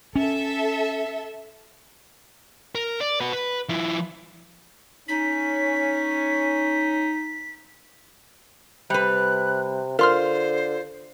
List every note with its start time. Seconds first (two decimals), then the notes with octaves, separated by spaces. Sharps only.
0.16 C#4 A4 E5
2.75 A#4
3.01 D5
3.21 F#4 B4
3.33 B4
3.69 F3 E4
5.08 C#4 D#4 B6
8.90 C3 G3 B4 F#6
9.99 D3 F4 A#4 C5 C6 F6